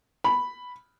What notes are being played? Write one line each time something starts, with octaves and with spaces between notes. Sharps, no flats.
B5